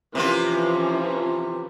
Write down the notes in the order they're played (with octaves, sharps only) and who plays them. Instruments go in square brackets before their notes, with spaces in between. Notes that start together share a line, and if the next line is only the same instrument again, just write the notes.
[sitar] C3 A#3 F4 [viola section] E3 F3 C#4